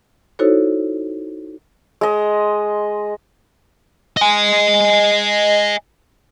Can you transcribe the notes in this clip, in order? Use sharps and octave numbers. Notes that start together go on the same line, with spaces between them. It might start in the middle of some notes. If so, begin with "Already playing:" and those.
D#4 E4 F#4 A4 C5 C#5
G#3 D#5
D#5 G#5